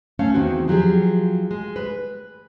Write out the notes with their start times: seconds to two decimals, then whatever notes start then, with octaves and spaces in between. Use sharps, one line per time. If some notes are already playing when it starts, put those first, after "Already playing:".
0.19 A3 C#4 F5
0.34 E2 D#3 C4 F#4
0.68 F3 F#3 G4 G#4
1.51 G#3
1.76 B4